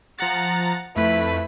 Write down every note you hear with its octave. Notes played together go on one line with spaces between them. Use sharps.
F3 F#5 A#5 A6
F2 A3 E4 B4 B6